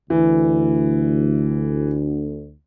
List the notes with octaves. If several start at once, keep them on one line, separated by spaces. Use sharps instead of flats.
D2 E3